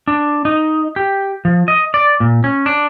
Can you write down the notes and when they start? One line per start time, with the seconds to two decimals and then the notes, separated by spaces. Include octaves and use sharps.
0.07 D4
0.45 D#4
0.96 G4
1.45 F3
1.68 D#5
1.94 D5
2.20 A#2
2.44 C#4
2.66 D4